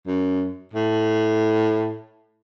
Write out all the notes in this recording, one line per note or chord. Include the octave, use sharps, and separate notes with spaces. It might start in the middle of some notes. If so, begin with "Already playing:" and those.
F#2
A2